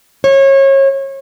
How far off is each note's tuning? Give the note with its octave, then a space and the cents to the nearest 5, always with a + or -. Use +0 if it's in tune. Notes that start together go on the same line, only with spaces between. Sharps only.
C#5 -30